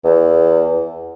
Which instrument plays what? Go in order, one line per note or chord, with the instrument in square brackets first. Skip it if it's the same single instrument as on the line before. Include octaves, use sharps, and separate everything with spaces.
[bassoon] E2